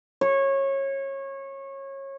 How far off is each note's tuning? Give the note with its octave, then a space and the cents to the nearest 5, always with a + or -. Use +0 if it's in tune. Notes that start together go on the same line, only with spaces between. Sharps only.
C#5 -25